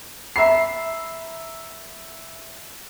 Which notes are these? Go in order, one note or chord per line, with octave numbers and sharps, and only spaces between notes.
E5 A#5 B5 C7